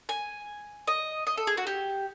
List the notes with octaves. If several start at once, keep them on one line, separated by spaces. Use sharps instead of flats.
G#5
D#5
D#5
A4
G#4
F#4
G4